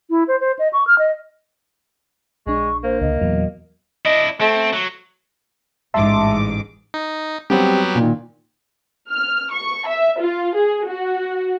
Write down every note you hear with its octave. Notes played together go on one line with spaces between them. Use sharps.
E4
C5
C5
D#5
C#6
F6
D#5
A#1 G#3 D4 C#6
A#3 C5
C#2 D3 D#5
E2 A#2 E3 F#3 B3
D4 E4 D#5
A3 C4
F#3
A1 G#2 E5 A5 C6 D6
D#4
F#3 G3 B3 C4 G4
A#2 D#3
F6
C#6
E5
F4
G#4
F#4